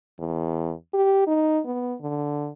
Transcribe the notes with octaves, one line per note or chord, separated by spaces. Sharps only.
E2
G4
D#4
B3
D3